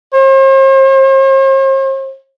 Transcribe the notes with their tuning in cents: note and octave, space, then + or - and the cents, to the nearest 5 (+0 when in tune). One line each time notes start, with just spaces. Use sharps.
C5 +45